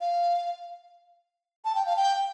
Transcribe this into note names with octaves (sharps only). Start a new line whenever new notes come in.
F5
A5
G5
F5
G5